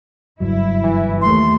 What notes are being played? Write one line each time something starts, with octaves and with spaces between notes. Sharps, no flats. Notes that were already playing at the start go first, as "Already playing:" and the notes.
F#1 G2 F#3 E4
E3
D#2 A3 C6